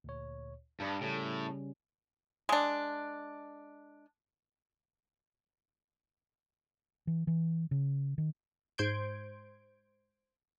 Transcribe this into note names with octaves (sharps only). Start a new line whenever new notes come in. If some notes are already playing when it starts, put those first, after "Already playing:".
D2 A#2 C#5
G2 A5 B5 D#6
A2 C#3 G3 C#4
G#3 D4
E3
E3
C#3
D#3
G#2 C5 C6 G6 G#6 D7